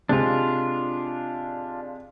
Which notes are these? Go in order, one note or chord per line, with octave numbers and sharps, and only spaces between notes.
C3 G#3 D4 F4